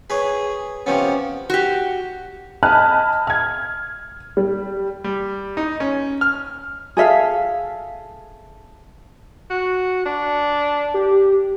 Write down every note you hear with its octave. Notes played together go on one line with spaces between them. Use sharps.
G#4 B4 C#5
C3 F3 B3 C#4
F#4 G4
D#5 G#5 A5 B5 F6 F#6
F6 G#6
G3
G3
D#4
C#4
F6
G#4 A4 E5 F5
F#4
D4
G4